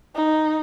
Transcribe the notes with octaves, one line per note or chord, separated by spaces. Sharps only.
D#4